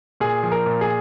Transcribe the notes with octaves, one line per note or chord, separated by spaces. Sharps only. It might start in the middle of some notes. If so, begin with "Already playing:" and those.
A#2 G#4
F3
A#4
A#2
G#4